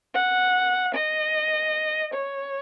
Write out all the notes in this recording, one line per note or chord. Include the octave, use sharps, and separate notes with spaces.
F#5
D#5
C#5